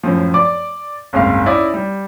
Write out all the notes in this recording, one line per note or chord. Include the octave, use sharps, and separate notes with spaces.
F#2 A2 F3
D5 D6
F#1 C2 G#2 F5
C#4 D#4 E4 D5 D#5
G3